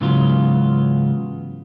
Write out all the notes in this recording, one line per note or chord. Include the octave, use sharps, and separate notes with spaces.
G#2 C#3 E3 F#3 B3 F4